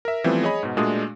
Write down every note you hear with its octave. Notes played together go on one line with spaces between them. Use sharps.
A#4 E5
E3 F3 G3 A3 B3 C4
G#4 C#5 D#5 B5
G#2 B2
A#2 G#3 A3 D4 F#4 D#6